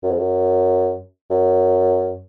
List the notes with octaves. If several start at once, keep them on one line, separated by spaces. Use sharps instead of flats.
F#2
F2
F#2
F#2